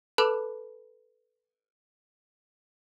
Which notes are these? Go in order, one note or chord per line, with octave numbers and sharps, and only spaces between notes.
A4 B4 A5 B5 D6 F#6